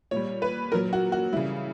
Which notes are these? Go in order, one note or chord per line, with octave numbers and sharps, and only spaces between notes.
A#2 G3 C#5
B4
A#2 F#3 A#4
F#4
F#4
C#3 E3 G3 E4